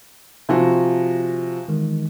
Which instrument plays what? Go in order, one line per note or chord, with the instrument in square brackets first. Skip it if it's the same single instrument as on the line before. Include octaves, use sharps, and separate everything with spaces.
[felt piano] C3 F3 F#4 [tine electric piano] E5 F5 G#5
[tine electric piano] D#3 E3 G#3